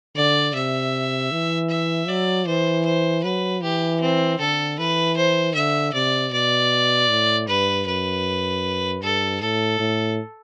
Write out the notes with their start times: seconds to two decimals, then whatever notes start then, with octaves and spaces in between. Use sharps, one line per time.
0.16 D3 D5
0.53 C3 E5
1.32 E3
1.70 E5
2.08 F#3 D5
2.47 E3 C5
2.85 C5
3.24 F#3 B4
3.63 E3 G4
4.01 C4
4.39 D3 A4
4.79 E3 B4
5.17 C5
5.55 D3 E5
5.94 C3 D5
6.32 B2 D5
7.10 A2
7.48 G2 B4
7.86 F#2 B4
9.02 G2 A4
9.41 A2 A4
9.80 A2